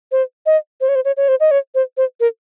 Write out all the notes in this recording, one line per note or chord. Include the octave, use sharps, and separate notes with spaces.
C5
D#5
C5
C#5
C5
C#5
C#5
C5
D#5
C#5
C5
C5
A#4